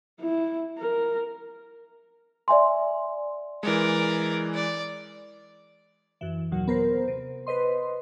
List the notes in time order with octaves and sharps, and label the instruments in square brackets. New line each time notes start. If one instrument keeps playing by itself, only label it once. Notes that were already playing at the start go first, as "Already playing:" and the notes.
[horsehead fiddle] E4
A#4
[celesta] D5 E5 G#5 C6
[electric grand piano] E3 G#3 [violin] A#4 D5
[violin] D5
[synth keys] F#2 E3
D#2 A#2 F#3
B3 A#4 C5
C3
B4 C5 D#5 C6